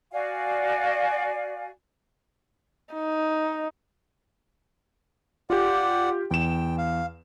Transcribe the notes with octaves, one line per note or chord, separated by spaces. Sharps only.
F#4 D5 F5 G#5
D#4
F4 G4 D5 F#5
E2 G5 E7
F5